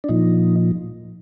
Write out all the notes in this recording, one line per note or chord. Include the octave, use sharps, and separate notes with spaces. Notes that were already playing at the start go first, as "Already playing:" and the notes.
D4
A#2 F3 D#4